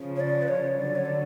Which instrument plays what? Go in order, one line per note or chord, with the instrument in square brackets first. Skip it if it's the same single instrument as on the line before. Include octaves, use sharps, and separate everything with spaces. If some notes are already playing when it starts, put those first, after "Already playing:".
Already playing: [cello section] C#3 F3
[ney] C#5
D5
B4
C#5
[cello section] D3 F#3 [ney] D5
[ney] C#5
D5